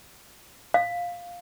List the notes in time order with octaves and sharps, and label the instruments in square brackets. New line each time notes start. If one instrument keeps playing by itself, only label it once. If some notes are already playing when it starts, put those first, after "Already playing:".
[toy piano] F5